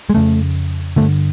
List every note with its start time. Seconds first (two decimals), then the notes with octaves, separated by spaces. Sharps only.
0.10 G#3
0.15 F2 C#3 A3
0.96 G2 D3 A3